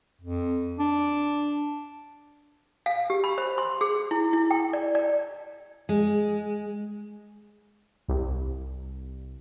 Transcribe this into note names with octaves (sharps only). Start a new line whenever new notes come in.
F2
D4
F5
G4
B5
C5
C6
G#4
E4
E4
G5
D5
D5
G#3
C2